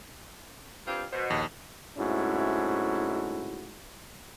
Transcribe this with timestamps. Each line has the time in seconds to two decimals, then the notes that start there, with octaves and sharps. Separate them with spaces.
0.87 G2 C4 F4
1.12 B2 C5
1.30 A#1 D#2
1.97 C2 G#2 A3 C#4 E4 F#4